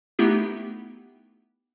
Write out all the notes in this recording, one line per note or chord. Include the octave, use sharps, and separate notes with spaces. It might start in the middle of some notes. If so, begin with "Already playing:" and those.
A3 B3 D#4 E4 G4